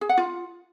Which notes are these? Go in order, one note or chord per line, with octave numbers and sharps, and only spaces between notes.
G#4
F#5
F4